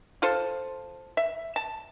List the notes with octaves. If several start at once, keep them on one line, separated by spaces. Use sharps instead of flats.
F4 A4 C5
E5
A5